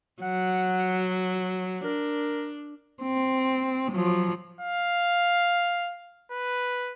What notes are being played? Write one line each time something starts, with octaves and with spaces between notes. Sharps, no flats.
F#3 F#5
D4 A#4
C4
F3 F#3
F5
B4